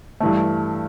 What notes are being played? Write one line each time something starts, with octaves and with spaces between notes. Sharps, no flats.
G2 E3 A3